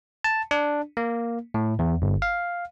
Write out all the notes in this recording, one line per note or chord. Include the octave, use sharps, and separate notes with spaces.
A5
D4
A#3
A2
E2
G1
F5